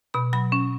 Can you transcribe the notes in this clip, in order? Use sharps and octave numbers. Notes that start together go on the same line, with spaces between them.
B2 B5
F#3 B5
C#4